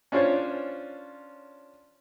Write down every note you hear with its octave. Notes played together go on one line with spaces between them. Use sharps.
C#4 D4 F4 C5 C#5